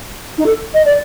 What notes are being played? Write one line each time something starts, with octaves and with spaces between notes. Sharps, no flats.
D#4
A4
D#5
D5